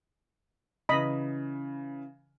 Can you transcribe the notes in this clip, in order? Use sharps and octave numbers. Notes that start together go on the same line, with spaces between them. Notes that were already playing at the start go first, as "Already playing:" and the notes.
C#3 E3 D#5 B5